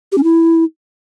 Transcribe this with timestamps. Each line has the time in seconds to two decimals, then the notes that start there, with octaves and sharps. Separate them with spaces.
0.12 G4
0.18 C#4
0.23 E4